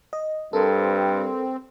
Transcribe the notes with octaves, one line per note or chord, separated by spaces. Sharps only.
D#5
G2 G3 C4 A4 A#4